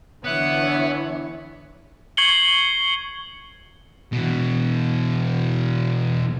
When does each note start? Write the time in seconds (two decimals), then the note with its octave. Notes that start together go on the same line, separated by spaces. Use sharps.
0.24 D3 E3 B3 D4 C#5 E5 F#5
2.17 C#6 G#6 C7 C#7 F#7 G7
4.13 B2 E3